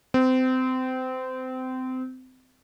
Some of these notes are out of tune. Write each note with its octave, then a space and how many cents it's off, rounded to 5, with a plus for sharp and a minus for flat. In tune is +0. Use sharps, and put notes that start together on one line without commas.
C4 -25